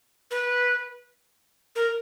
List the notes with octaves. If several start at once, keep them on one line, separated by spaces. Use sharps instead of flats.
B4
A#4